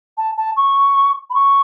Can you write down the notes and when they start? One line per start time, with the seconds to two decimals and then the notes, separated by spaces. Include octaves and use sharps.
0.18 A5
0.37 A5
0.57 C#6
1.30 B5
1.35 C#6